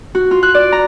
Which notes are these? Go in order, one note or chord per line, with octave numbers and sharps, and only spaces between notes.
F#4
F4
F#6
D5
A#5